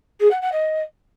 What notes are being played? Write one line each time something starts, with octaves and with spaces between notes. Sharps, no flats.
G#4
F#5
F#5
D#5